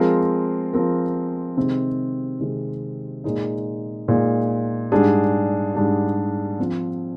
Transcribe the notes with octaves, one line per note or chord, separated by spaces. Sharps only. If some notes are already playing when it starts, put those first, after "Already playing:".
Already playing: F3 G#3 C4 F4 A#4
F3 G#3 C4 F4 A#4
C3 D#3 G#3 C4
C3 D#3 G#3 C4
A#2 G#3 D#4
A#2 G#3 D#4
G#2 G3 D4 G#4
G#2 G3 D4 G#4
F3 C4 F4